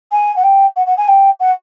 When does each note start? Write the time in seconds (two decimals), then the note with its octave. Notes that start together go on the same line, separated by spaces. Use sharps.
0.11 G#5
0.36 F#5
0.43 G5
0.76 F#5
0.86 F#5
0.97 G#5
1.07 G5
1.39 F#5